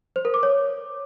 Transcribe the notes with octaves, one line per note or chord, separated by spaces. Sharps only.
C5
A#4
D6
C#5